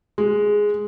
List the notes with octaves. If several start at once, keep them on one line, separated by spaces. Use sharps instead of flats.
G#3